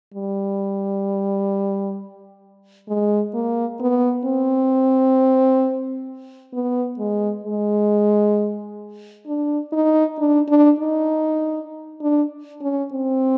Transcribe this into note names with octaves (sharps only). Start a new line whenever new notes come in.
G3
G#3
A#3
B3
C4
B3
G#3
G#3
D4
D#4
D4
D4
D#4
D4
C#4
C4